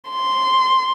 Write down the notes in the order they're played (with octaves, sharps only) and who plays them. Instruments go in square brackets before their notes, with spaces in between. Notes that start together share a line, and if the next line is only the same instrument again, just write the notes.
[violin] C6